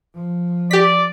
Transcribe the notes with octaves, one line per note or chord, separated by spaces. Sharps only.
F3
G4 D5 B6